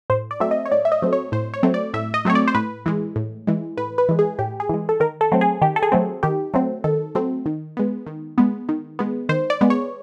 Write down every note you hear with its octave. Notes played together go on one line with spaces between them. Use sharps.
A2 C5
D5
F#3 A3 C4 E5
D#5
C#5
A2 D5
E5
D#5
F#3 A3 C4
C#5
A2 C5
C#5
F#3 A3 C4
D5
A2 E5
D#5
F#3 A3 C4 C#5
D5
C5
A2 B4
E3 G#3
A2
E3 G#3
A2 B4
B4
E3 G#3
G#4
A2 G4
G#4
E3 G#3
A4
D#3 A#4
A4
F#3 A3 C4
G#4
D#3 G4
A4
G#4
F#3 A3 C4
D#3 G4
F#3 A3 C4
D#3 A4
F#3 A3 C4
D#3
G#3 B3
D#3
G#3 B3
D#3
G#3 B3
D#3 C5
D5
G#3 B3
C#5